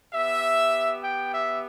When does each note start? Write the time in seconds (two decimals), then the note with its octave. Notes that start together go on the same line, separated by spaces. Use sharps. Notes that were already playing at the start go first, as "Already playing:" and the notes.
0.13 B3 G4 E5
1.03 G5
1.32 E5